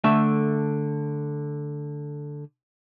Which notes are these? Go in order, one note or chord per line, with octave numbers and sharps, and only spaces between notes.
D3 A3 E5